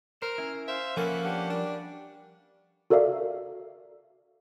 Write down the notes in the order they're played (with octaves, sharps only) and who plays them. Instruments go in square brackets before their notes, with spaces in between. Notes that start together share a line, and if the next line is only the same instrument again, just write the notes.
[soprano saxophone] A#4 [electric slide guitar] C5
[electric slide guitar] C#4 E4
[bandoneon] C5 F5 [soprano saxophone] E5
[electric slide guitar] F3 A4 [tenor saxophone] A#3 [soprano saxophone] C#4 [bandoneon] B4 F#5 F#6
[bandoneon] D4 G4 F#5
[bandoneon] G3 [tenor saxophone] D4
[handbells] F#4 A4 A#4 D5 E5 F5